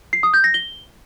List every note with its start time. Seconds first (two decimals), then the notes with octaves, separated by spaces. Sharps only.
0.13 C7
0.23 D#6
0.34 G6
0.44 A#6
0.54 G7